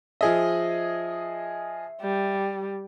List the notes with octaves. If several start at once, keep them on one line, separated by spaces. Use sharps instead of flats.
F3 G#4 D#5 E5
G3